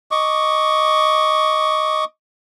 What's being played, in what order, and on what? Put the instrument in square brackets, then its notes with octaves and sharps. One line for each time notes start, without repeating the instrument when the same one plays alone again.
[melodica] D#5 C#6 D6